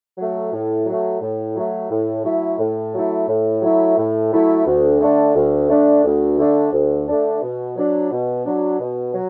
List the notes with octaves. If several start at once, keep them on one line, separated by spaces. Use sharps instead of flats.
F#3 A3
A2
F#3 A3
A2
F#3 A3
A2
F#3 A3 E4
A2
F#3 A3 E4
A2
F#3 A3 E4
A2
F#3 A3 E4
D2
D3 A3 D4
D2
D3 A3 D4
D2
D3 A3 D4
D2
D3 A3 D4
B2
F#3 D4
B2
F#3 D4
B2
F#3